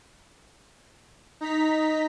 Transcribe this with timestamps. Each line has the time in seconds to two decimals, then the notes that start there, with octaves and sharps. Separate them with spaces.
1.41 D#4 A#5 B6